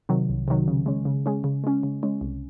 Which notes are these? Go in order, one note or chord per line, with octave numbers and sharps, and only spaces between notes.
C3 D#3 F#3
C2
C3 D#3 F#3
C#3
G#3 C#4
C#3
G#3 C#4
C#3
G#3 C#4
C#3
G#3 C#4
C2